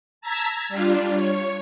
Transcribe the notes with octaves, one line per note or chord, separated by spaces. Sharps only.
A5 A#5 E6 G#6 B6
G3 D4 F4
C#5